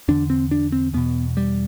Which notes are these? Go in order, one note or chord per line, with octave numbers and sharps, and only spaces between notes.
E2 D3 D4
C4
D4
C4
E2 B2 B3
G3